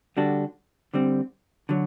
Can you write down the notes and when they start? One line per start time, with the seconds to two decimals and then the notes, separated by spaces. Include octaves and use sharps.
0.17 D3 G3 D4 F#4 A4
0.94 D3 G3 C4
1.69 D3 F#3